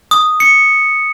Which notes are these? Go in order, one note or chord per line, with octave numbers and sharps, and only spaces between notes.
D#6
C#7